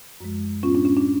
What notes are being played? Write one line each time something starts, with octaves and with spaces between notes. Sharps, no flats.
F#2 F3 G#3
A2 G#3 B3 C#4 F4
D4
C#4
D4